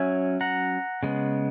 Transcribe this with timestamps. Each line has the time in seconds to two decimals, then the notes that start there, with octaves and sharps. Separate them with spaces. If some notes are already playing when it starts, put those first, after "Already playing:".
Already playing: F#3 C#4 E5 G#5
0.41 F#5 A#5
1.03 C#3 G#3 B3